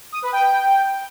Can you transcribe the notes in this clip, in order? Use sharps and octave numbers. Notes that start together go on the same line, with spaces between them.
D#6
B4
G5